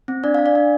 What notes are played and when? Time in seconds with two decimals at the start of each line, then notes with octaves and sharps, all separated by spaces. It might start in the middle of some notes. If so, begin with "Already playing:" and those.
0.08 C4
0.24 D4 D5
0.34 D4 F5
0.46 D5
0.55 D4